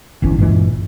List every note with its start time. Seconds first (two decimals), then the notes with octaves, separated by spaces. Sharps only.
0.22 D1 G1 E2 C#4
0.38 G2 A#2 E3 G#3